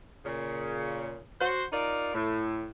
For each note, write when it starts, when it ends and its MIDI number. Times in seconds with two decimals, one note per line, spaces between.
0.25 1.20 46
0.25 1.20 49
1.40 1.65 66
1.40 1.65 72
1.72 2.13 63
1.72 2.13 65
1.72 2.13 70
1.72 2.13 74
2.14 2.69 45